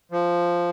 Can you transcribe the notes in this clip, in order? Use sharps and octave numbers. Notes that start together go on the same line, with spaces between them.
F3